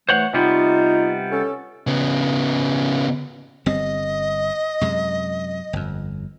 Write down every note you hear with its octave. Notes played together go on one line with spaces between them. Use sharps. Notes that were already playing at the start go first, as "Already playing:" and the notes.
E3 A3 C5 C#5 F#5
C3 G3 B3 D#4 F4
C#4 A4
C#3 B3
G1 G3 C4 D#5
F#2 C3 G#3
G1 F2